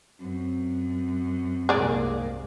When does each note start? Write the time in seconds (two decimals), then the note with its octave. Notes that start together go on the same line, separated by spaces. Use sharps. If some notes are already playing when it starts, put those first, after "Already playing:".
0.21 F#2 C4
1.69 C2 G#2 A#3 G#4 D5